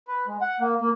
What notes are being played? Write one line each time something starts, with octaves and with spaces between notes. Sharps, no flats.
B4
G#3
F#5
A#3
A#3